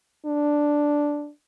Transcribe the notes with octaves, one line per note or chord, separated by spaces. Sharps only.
D4